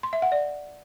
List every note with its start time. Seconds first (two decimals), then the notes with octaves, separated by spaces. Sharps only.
0.03 C6
0.13 E5
0.22 F#5
0.32 D5